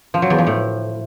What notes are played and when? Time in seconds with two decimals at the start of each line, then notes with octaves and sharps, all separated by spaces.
0.14 F3
0.22 F#3
0.30 E2
0.38 F3
0.47 A2